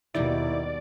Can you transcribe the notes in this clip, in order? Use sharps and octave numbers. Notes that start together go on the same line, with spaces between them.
D#2 B2 D#3 G3 D#4 E4 D5